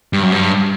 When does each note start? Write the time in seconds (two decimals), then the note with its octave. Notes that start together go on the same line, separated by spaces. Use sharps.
0.13 G2
0.23 F#2
0.32 G2